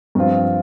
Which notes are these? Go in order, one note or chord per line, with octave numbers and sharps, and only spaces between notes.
G2 F3 C4 F4